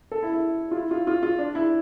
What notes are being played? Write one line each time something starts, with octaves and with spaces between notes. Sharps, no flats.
A4
E4
E4
F4
E4
F4
F4
F4
D4
E4